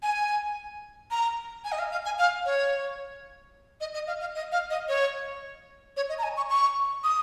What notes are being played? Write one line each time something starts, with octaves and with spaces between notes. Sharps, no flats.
G#5
A#5
G#5
D#5
F5
F5
G#5
F5
C#5
D#5
D#5
F5
F5
D#5
F5
D#5
C#5
C#5
D#5
A#5
G#5
C#6
C#6
D#6